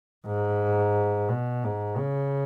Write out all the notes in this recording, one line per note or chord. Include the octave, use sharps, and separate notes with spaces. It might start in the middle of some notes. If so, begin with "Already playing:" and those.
G#2
B2
G#2
C#3